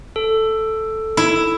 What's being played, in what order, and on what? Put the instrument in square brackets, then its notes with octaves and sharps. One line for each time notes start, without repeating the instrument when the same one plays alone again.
[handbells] A4
[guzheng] E4